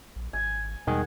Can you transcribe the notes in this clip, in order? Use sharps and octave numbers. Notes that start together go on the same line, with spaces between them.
A#1
G#1 G#5
E2 B2 D#3 G3 G#3 G#4 F#5